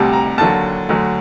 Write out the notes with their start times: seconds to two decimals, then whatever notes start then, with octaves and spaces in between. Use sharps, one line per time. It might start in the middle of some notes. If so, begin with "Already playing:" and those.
Already playing: D2 C3 G3 A5
0.13 A#5
0.38 D#2 D3 F#3 A5
0.89 D2 D3 F#3